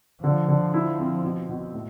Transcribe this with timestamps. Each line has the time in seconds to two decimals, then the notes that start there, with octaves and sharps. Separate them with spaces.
0.23 D3 F3
0.48 D3
0.74 E4
0.98 C4
1.24 B2
1.49 B2
1.74 A2